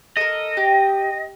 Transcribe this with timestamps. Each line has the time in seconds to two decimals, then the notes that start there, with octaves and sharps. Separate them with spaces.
0.17 A4 A#4 D#5
0.57 G4